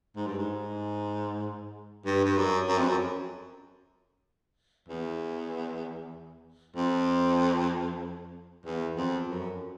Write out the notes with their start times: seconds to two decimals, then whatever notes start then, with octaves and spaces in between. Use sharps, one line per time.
0.16 G#2
0.27 G2
0.38 G#2
2.06 G2
2.25 G2
2.37 F#2
2.68 F#2
2.78 F2
2.88 F#2
4.89 E2
6.76 F2
8.65 E2
8.97 F2
9.28 F#2